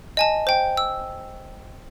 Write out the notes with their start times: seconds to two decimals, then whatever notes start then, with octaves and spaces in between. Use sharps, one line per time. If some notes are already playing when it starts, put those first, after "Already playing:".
0.17 D#5 G#5 A5
0.47 C5 G5
0.77 E6